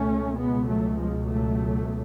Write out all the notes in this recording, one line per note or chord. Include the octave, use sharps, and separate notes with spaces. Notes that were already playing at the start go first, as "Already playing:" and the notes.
Already playing: C#2 B2 A3 C#4
G#3 B3
F#3 A3
F3 G#3
F#3 A3